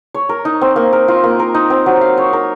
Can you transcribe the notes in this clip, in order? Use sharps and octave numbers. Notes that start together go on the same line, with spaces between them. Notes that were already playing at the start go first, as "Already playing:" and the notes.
C#5
A#4
D#4
C4
A#3
A#4
F4
A#3
A#4
D#4
C4
F#3
F5
C#5
A#4